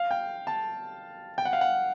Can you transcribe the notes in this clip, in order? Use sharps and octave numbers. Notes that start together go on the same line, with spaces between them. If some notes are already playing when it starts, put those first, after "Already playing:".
Already playing: F5
G5
A5
G5
F#5
F5
F#5